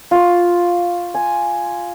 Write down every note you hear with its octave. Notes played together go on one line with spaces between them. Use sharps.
F4 C#6
G#5